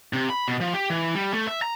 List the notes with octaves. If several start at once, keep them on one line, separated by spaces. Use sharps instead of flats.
C3
B5
B2
F3
G4
E3
G3
A3
E5
A#5